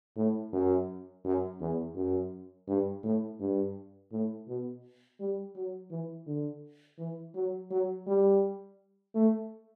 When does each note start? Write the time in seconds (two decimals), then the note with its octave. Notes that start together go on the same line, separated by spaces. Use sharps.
0.16 A2
0.53 F#2
1.25 F#2
1.60 E2
1.95 F#2
2.68 G2
3.03 A2
3.40 G2
4.12 A2
4.48 B2
5.20 G3
5.56 F#3
5.90 E3
6.27 D3
6.98 E3
7.35 F#3
7.71 F#3
8.07 G3
9.15 A3